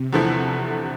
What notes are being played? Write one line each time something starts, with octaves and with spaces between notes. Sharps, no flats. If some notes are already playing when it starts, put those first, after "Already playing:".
Already playing: C3
E2 D3 F3 A3 E4